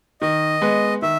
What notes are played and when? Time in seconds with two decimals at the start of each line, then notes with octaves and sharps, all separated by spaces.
0.22 D#3 D#5
0.62 G#3 B3
1.02 D#3 E5